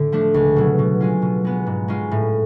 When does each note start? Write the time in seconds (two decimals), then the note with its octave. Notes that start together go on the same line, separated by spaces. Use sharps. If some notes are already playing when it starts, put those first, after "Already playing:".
Already playing: A2 D3
0.12 F3 A3 D4
0.34 C#2
0.56 B2 F#3
0.79 B2
1.01 G#3 C#4 F4
1.22 B2
1.45 G#3 B3
1.67 G#2
1.88 G#3 C#4 F4
2.11 A2